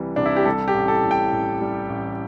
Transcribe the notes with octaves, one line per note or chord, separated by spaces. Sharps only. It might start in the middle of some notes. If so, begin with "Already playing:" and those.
Already playing: C2 C3 E3 G3
C2 D4
E4
G4
G3 A4
G4
A1
A4
A2
G5
A1
G3
A1